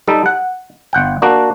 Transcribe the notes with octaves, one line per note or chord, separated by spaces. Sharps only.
G3 D#4 A4
F#5
G1 F#5 G5
A#3 D4 F#4